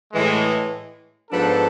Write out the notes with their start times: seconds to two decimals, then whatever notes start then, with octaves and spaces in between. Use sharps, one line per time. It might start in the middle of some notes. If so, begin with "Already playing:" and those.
0.14 A2 E3 G#3
1.31 G#2 F3 B3 D4 A4